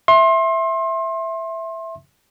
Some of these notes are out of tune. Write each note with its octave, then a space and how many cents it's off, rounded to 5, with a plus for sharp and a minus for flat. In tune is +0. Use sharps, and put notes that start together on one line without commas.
E5 +0 C6 +30